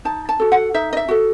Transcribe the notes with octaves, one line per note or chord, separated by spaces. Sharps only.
D#4 A5
A5
F#4 A4
F#5
D#4 E5
D#5
E5
F#4 A4